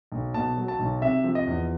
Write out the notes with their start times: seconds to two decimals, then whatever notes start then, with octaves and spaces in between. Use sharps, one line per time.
0.12 B1
0.34 B2 A5
0.57 F#3
0.68 A5
0.79 B1
1.02 C3 E5
1.24 F3
1.35 D#5
1.47 E2